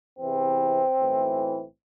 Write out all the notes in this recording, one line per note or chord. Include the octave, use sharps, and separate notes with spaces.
E2 C3 E3 C4
B1 A2 E3